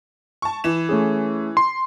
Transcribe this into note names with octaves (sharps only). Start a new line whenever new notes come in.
A5 C#6
E3 E7
A3 C#4 G#4
C6